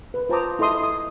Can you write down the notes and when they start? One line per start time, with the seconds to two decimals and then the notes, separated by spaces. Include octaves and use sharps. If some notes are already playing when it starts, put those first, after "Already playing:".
0.14 B4
0.29 F4 C5 A5 A#5 D6 D#6
0.59 E4 A4 D#5 C6 D#6
0.83 D#6